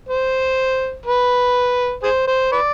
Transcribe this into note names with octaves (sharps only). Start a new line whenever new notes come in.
C5
B4
G#4 C5
C5
B4 D5